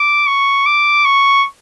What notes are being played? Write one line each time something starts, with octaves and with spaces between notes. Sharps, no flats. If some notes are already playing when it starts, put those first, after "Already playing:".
Already playing: D6
C#6
D6
C#6